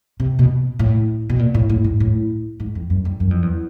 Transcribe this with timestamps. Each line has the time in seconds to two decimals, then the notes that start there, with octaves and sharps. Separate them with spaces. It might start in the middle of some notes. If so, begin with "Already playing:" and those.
0.20 C3
0.39 B2
0.79 A2
1.30 B2
1.39 A#2
1.54 A2
1.69 A2
1.84 G#2
2.00 A2
2.60 G#2
2.75 F2
2.90 F#2
3.05 G2
3.20 F#2
3.31 F2
3.42 E2